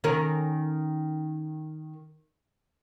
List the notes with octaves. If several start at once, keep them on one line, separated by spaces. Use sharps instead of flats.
D#3 C#4 A#4